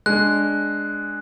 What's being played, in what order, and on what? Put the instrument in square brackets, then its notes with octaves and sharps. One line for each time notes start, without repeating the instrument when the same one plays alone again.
[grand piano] G#3 D4 [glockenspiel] F#6